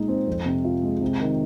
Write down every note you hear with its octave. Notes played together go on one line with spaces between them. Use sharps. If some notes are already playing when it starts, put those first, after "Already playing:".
Already playing: A#2 G#3 D#4
C4
F2
C3
F4
G#3
C3
D#3